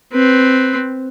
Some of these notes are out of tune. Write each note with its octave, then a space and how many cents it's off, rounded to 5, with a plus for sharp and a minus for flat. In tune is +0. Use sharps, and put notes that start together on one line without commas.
C4 +0 B4 +0